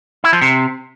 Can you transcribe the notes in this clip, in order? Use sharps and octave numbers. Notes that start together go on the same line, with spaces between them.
E4
F3
C3